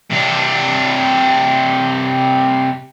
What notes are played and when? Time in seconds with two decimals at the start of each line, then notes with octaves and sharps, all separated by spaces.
0.10 C3 D4